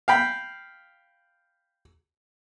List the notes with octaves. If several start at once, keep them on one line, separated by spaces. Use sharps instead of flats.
F5 G5 B5